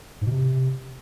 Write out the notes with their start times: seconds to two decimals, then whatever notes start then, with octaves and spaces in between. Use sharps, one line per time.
0.21 G#2
0.26 B2
0.31 C3